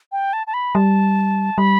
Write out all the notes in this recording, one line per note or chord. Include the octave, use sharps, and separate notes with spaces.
G5
A5
A5
B5
G3 A5
G3 B5